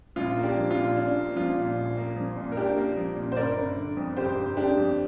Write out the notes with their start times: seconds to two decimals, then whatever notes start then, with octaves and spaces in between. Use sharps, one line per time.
0.16 A#1 F4
0.36 A#3
0.43 D4 G4
0.57 F3
0.71 F4
0.77 A#2
0.97 A#1 D4
1.17 A#3
1.36 F3 F4
1.57 A#2
1.76 A#1
1.97 A#3
2.16 F3
2.37 A#2
2.52 A#4
2.57 A#1 D4 G4
2.77 A#3
2.97 F3
3.17 A#2
3.32 C5
3.36 G1 A#4 D5
3.57 G1
3.77 D3
3.97 F2
4.17 G1 G4 C5
4.37 G1
4.57 D3 D4 G4
4.77 F2